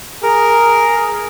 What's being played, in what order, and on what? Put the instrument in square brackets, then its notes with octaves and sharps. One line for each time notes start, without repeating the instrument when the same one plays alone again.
[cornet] G#4 [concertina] A#4